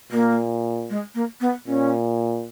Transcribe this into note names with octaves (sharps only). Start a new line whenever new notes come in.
A#2 A#3
G#3
A#3
B3
A#2 C#4